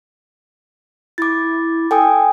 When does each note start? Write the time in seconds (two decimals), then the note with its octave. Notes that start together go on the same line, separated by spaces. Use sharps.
1.18 E4 D6 A6
1.91 A4 G5 G#5 D#6